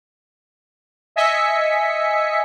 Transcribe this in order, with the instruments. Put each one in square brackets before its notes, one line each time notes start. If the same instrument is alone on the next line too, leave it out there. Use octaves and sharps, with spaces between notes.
[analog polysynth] D#5 E5 G#5 B6 C#7